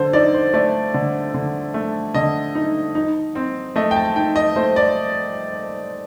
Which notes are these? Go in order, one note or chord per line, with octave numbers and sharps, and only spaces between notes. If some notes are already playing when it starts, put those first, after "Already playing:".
Already playing: D3 A4 C5
D#4 D5
C5
A3 D5
D3
D3
A3
D3 D#5
D#4
D#4
C4
A3 D#5
G5
A5
D#4 G5
D#5
A3 C5
D5